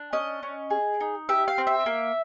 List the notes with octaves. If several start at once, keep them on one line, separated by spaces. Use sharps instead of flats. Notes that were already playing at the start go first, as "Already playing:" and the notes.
Already playing: D4
C#4 D#5
C#4
G#4
D#4
G4 E5
F5
C4
E5
A#3